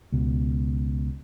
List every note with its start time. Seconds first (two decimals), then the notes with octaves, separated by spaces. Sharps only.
0.12 C#2 B2